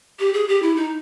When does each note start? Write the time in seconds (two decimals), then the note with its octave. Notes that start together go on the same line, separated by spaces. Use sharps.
0.19 G4
0.34 G#4
0.48 G4
0.62 E4
0.77 D#4